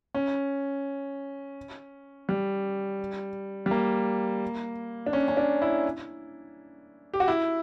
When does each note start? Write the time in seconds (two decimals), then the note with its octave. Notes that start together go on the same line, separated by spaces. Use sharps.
0.14 C#4
2.29 G3
3.66 G3
3.71 A#3
5.06 D4
5.13 C#4
5.28 C#4
5.37 D4
5.62 E4
7.14 G4
7.20 F#4
7.28 E4